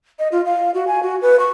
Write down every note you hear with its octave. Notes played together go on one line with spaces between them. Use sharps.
D#5
F4
F5
F#4
G#5
F#4
B4
C#6